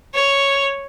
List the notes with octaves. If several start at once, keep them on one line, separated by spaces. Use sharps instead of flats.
C#5